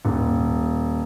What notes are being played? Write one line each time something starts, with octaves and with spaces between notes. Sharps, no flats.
D#1